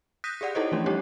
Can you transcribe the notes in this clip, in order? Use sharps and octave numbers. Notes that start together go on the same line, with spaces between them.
D#6 F#6 G6 A#6 B6 D#7
G4 G#4 D5 F#5
D#4 E4 A4 C5 C#5 D#5
E3 F3 A3 C#4 D4
G3 A3 C#4 D#4 G4 C#5